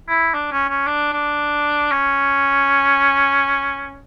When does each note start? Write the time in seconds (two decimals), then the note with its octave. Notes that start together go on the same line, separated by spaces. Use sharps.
0.08 E4
0.34 D4
0.52 C#4
0.69 C#4
0.87 D4
1.12 D4
1.91 C#4